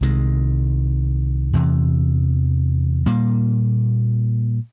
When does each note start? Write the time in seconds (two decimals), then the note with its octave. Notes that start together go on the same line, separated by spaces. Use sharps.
0.01 C2 C3 D#3 G#3
1.53 E2 C3 E3
3.06 A#2 G3 A#3